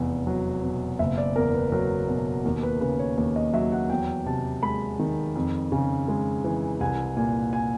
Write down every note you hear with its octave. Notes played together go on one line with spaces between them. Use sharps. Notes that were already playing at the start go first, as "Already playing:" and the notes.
Already playing: F1 E2
F#3
B2
F#1 E5
D5
E2 A#4
B4
F#3 A#4
B2
D#2 A#4
B4
C#3 B4
C#5
D#2 C#5
D#5
F#3 E5
F#5
E2 G5
C3 A5
G#3 B5
D#3
F2
C#3
G#3
E3
C2 G#5
A#2 G#5
G#5